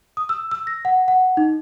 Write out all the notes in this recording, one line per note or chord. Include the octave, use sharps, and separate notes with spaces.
D#6
E6
E6
A#6
F#5
F#5
D#4